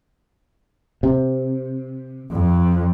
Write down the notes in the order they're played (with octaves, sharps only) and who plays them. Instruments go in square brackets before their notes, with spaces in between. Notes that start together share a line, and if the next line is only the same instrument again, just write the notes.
[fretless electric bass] C3
[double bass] F2